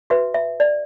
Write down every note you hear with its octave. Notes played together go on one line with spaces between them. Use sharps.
F#4 B4 E5
E5
D5